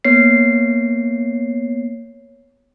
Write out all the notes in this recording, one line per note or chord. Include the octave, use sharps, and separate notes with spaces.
A#3 B3 C#5 C7